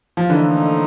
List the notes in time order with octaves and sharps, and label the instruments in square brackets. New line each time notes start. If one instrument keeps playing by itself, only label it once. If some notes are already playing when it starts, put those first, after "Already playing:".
[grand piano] F3
[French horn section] A2 F3 A#3 D#4 [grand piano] D3 E3